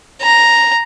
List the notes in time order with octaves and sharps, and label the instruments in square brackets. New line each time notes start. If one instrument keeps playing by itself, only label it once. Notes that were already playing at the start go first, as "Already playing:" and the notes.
[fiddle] A#5